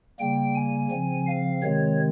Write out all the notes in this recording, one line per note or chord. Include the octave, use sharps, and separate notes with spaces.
C#3 G3 A#3 G5
G#5
C#3 F3 C4
F5
C3 D#3 G#3 C4 C#5